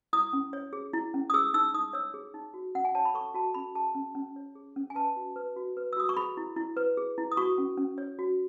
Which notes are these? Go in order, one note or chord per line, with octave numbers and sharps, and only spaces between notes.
E4 D#6
C#4
C#5
G#4
E4
C#4
D#6
G#4 E6
D#4 E6
D#4 D#6
C#5 E6
G#4
D#4
F#4
C#4 F#5
G#5
C#5 A5
B5
A4 C#6
F#4 A5
C#4 B5
G#4 A5
C#4
C#4
C#5
G#4
C#4
G#5
B4 A5
F#4
B4
F#4
B4
E6
F#4 D#6
C#6
G#4 B5
E4
E4
B4
G#4
E4
D#6
F#4 C#6
C#4
C#4
C#5
F#4